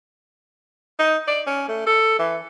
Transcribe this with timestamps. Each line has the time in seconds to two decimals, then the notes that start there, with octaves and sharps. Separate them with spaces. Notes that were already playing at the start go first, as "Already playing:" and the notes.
0.99 D#4
1.28 D5
1.47 C#4
1.68 A3
1.86 A4
2.19 E3